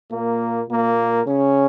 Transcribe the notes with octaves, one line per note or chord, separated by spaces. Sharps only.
A#2 A#3
A#2 A#3
C#3 C#4